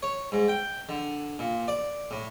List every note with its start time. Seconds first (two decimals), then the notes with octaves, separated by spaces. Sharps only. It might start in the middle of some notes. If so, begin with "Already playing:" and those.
0.03 C#5
0.32 G#2
0.48 G5
0.89 D3
1.39 A#2
1.68 D5
2.11 A2